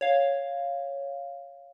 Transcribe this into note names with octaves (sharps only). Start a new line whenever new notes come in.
C#5 F5